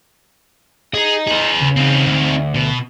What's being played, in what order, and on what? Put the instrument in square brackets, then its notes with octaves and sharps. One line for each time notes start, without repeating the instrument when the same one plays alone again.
[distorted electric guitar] G#4 [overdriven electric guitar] D#5 A#5
[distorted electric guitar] G#4 B4
[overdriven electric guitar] C#3
[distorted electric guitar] C4 D#4
[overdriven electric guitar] D2
[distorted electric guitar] B2